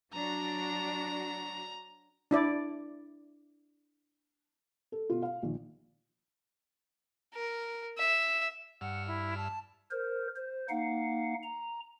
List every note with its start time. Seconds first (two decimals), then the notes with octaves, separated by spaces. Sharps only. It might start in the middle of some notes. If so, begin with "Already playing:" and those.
0.14 F#3 D4 F#4 A#5
2.31 D4 E4 D5
4.92 A4
5.10 B2 F4
5.22 F5
5.43 A#1 D#3
7.35 A#4
7.98 E5
8.81 G2 F#5 E6 F6
9.07 E4
9.37 A5
9.91 A#4 C5
10.36 C5
10.69 A#3 D#4 F5 F#5
11.43 A#5